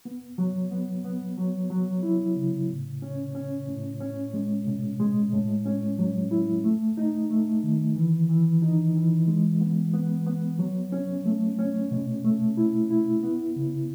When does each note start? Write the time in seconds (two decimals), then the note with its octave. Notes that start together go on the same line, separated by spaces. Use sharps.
0.05 B3
0.38 F#3
0.71 B3
1.04 B3
1.37 F#3
1.70 F#3
2.03 E4
2.36 C#3
2.69 A2
3.02 C#4
3.35 C#4
3.68 A2
4.00 C#4
4.34 G#3
4.67 B2
5.00 G#3
5.33 A2
5.66 C#4
5.99 F#3
6.31 E4
6.64 A3
6.97 D#4
7.30 A3
7.63 D#3
7.96 E3
8.29 E3
8.62 D#4
8.95 E3
9.27 G#3
9.61 B3
9.93 B3
10.26 B3
10.59 F#3
10.92 C#4
11.26 A3
11.59 C#4
11.91 B2
12.24 A3
12.57 E4
12.90 E4
13.23 B3
13.56 C#3